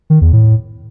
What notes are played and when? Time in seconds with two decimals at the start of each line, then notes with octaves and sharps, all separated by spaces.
0.10 D#3
0.21 E2
0.33 A2